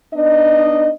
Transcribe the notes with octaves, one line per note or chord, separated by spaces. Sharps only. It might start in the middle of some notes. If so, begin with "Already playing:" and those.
B3 D4 D#4 D#5